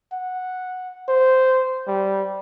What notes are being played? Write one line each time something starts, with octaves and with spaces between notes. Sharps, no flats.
F#5
C5
G3